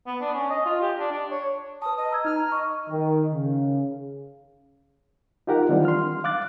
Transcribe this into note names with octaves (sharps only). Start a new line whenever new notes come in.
B3
D4
C#4
D#5
F4
G4
D4
D4
C#5
B4 A5 D#6
D#5
A#5 E6 G#6
D#4 F6
A#5
D#5 C#6
D#3
C#3
D#4 F4 G4 A#4 F#5
D#3 E3 G3 C4 D4 F4
C6 F6
F5 D6 F#6 A6